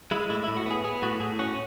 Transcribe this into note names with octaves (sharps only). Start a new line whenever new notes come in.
G#3 E4
A2 E4
E4
A2
F#4
B3 G#4
B3 G#4
A2 F#4
A2 G#4
C#4 F#4